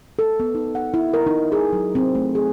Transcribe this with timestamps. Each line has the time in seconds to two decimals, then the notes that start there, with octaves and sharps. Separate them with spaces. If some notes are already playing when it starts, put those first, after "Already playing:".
0.19 A4
0.40 B3
0.55 D#4
0.75 F#5
0.94 E4
1.14 A#4
1.27 D#4
1.52 G#4
1.73 F#3
1.95 C4
2.15 A3
2.35 G#4